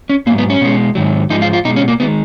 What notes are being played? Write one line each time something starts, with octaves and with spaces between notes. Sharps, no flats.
C#4
G#2 F#3 A#3
B3
C#4
B2 G#3
G#2 D#3 F#3
G#2 F3 G#3 D#4
F4
F4
B2 G#3 D#4
C#4
A#3
D#3 G#3 B3